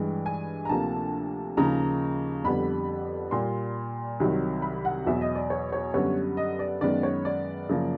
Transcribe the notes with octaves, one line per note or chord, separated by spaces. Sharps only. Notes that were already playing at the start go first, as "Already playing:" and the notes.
Already playing: G2 E3 G#3 G5
G#5
A#5
D2 C3 F3 A#3 A5
D#2 C#3 F3 A#3 A#5
F2 D3 G3 B3 B5
A#2 G3 A#3 C6
C2 C3 D#3 F#3
B5
F#5
E2 B2 F#3 E5
D#5
D5
C#5
C#5
F#2 D3 G3 B3 C#5
D#5
D5
F#2 D#3 G#3 B3 D5
C#5
D5
F#2 C#3 F3 A#3